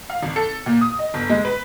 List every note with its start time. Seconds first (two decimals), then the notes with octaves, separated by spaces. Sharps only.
0.10 F5
0.23 G#1
0.36 A4
0.66 A#2
0.81 D#6
0.99 D#5
1.14 G1
1.29 G#3
1.45 B4